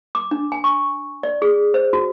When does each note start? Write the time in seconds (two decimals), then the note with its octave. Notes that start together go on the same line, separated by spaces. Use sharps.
0.15 D6
0.31 D4
0.52 G#5
0.64 C#6
1.23 D5
1.42 G#4
1.74 C5
1.93 F#4